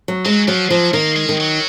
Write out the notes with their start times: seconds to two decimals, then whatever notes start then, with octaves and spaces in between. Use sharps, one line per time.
0.08 F#3
0.26 F#3 G#3
0.48 F3 F#3
0.70 F3 F#3
0.93 D#3 A#3
1.16 G#3
1.29 D#3
1.40 F#3